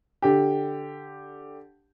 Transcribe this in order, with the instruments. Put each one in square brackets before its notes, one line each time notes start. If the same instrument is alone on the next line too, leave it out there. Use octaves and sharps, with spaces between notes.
[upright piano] D3 G4